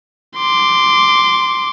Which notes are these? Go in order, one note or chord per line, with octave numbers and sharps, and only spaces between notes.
C6 D6